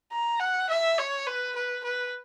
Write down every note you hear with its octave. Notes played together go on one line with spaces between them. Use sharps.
A#5
F#5
E5
C#5
B4
B4
B4